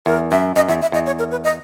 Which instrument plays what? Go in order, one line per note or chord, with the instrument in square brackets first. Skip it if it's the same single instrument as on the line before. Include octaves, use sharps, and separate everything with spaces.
[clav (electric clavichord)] E2 [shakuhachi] A#4
[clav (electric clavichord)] F#2 [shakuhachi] E5
[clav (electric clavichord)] F#2 [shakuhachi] D#5
[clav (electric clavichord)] E2 [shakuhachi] E5
[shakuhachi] E5
[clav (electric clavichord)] E2 [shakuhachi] D#5
[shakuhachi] C#5
A#4
B4
D#5